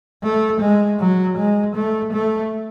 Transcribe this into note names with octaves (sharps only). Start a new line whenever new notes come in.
A3
G#3
F#3
G#3
A3
A3